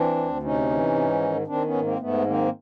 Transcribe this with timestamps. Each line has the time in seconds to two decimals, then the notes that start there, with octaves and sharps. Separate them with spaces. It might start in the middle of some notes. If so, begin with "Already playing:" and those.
Already playing: E3 C4 D4
0.17 D2
0.43 C3 C#4 D#4
0.70 E3
0.95 G#2
1.21 D#3
1.47 D#3 C4 D4
1.64 B3 C#4
1.74 G#2
1.82 A#3 C4
2.00 G#2 A3 B3
2.26 D#3 A#3 C4